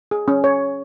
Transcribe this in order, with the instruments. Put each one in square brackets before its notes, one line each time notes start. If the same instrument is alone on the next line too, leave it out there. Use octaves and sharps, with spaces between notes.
[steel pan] G#4
C#4
C#5